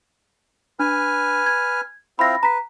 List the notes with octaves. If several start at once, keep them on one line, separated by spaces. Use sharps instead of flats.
D4 B4 G#5 F6
G#6
C4 E4 F4 B5 A#6
B4 A#5 B6